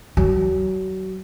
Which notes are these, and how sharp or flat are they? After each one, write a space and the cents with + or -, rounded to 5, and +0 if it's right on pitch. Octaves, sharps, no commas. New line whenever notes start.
F#3 +30